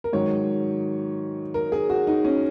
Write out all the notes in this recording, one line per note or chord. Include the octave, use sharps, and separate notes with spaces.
A#4
G#2 D#3 F#3 C#5
A#4
G#4
F#4
D#4
C#4